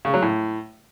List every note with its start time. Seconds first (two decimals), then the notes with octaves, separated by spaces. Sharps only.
0.05 C#3
0.14 F#3
0.22 A2